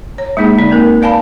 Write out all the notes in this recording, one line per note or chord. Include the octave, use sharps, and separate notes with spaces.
C#5
G#3 A#3 D#4 G#4
D3 D#4 D5
A#3 C4 A#4
B4 D5 F5 G#5 A5 B5